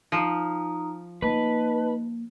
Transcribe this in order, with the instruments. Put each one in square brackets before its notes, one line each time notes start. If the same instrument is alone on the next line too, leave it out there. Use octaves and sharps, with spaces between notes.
[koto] F3 [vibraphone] D#4 A#5 D#6
[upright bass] A#3 [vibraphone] D#4 D#5 A5 [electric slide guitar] B4